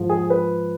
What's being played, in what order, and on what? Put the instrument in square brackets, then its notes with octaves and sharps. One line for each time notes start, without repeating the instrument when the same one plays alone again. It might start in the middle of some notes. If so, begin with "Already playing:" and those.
Already playing: [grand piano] G#2 F3
G#4
B4